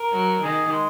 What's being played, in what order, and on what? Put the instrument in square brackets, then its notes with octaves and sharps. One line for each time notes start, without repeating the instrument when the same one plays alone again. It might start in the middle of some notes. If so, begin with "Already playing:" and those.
Already playing: [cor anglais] A#4
[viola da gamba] F#3
[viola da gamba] D#3 [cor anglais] G#4
[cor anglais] G#3